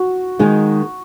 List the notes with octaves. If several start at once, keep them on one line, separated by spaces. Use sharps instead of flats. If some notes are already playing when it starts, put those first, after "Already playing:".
Already playing: F#4
D#3 G#3 D#4